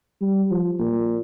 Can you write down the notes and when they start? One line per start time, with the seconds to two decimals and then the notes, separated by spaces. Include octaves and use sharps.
0.21 G3
0.51 F3
0.79 A#2